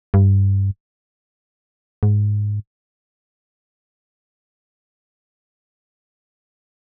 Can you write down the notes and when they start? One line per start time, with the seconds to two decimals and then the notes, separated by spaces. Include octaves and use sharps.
0.14 G2
2.03 G#2